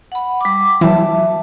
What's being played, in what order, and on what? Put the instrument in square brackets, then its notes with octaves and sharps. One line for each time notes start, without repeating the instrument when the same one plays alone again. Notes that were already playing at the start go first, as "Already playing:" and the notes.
[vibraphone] F#5 B5
G3 D6
[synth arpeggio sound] E3 F#3 [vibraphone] E5 A5